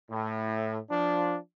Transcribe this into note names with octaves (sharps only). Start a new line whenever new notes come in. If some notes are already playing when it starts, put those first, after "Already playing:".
A2
F3 D4